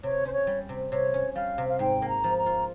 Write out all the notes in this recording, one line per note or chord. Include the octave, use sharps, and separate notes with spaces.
C3 C#5
C#4 C5
C#5
G3
C3
C3 C#5
C#4
G3 F5
C3
F5
G#2 G5
A#3
A#5
F3
A#5
F4